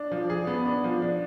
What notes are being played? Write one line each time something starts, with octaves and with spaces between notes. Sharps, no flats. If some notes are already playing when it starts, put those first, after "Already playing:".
Already playing: D4
F3
G#4
B3
D4
F3
D4